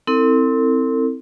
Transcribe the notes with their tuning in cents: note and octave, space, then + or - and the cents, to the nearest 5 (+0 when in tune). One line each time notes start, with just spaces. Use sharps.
C4 +0 E4 -30 A4 +40